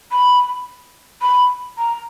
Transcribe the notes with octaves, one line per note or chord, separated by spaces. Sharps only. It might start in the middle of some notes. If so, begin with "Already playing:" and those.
B5
B5
A#5